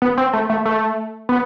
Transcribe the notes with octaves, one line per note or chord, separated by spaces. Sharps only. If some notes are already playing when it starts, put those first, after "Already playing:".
B3
C4
A3
A3
A3
B3